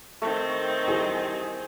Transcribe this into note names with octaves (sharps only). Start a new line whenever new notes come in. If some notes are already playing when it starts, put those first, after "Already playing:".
D#3 A3 C4
E4 G4 G#4 C5